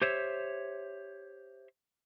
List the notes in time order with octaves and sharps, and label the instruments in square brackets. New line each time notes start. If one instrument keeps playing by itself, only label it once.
[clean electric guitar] G4 C5 C#5 E5